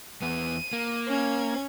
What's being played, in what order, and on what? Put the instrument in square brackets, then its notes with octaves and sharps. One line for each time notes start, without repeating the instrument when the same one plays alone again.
[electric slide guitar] E2 B3 [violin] D#7
[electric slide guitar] A#3
[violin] C#4 G#6